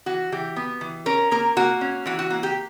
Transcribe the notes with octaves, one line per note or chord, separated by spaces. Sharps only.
E3 F#4
E3 G4
B3
E3
C#4 A#4
A#3 A#4
A#3 F#4
C#4
E3 F#4
F#4
A#3 F#4
G4